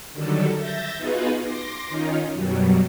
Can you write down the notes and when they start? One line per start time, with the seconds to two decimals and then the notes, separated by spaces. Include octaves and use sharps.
0.12 D3 D#3 F#3 G3 A4
0.57 E5 G6 A6 A#6
0.97 B3 D#4 F4 F#4 G#4 B4
1.43 C6 D6 A#6
1.89 D#3 C#4 D#4 F4
2.34 F#2 B2 F#3 G3